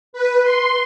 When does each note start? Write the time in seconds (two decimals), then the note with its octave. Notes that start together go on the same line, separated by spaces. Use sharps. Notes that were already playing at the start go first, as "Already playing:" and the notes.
0.13 B4
0.43 C6